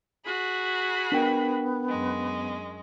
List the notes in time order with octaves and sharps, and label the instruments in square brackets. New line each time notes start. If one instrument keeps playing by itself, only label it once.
[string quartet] F#4 G#4 B5
[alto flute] B3 [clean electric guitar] D4 A#4 G5
[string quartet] F#2 G#3